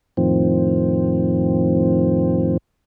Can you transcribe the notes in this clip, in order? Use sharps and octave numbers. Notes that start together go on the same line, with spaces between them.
F2 A2 D#3 F3 C4